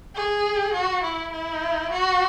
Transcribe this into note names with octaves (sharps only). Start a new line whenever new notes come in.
G#4
F#4
E4
E4
F#4